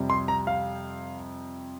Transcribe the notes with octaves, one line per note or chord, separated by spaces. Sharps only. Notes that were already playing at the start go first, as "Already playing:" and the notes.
Already playing: F2 C3 G3
C6
A#5
F5